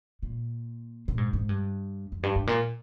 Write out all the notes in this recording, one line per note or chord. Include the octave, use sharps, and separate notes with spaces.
A#2
A#2
G#2
G#2
G2
F2
G2
G#2
A#2